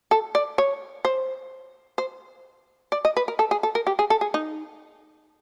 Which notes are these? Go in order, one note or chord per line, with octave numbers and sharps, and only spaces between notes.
A4
D5
C#5
C5
C5
D5
D#5
B4
A#4
A4
G#4
A4
A#4
G4
G#4
A4
G#4
D#4